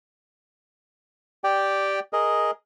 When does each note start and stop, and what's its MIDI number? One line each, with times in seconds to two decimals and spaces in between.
1.44 2.00 67
1.44 2.00 74
1.44 2.00 79
2.13 2.51 68
2.13 2.51 70
2.13 2.51 75